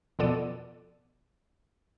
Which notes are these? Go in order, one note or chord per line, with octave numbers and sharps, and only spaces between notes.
F2 B2 B3 A4 D5 D#7